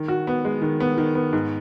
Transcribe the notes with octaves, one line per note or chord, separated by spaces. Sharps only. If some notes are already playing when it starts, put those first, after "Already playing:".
Already playing: D#3
F#4
B3
G#3
D#3
B3
D#3
B3
G#2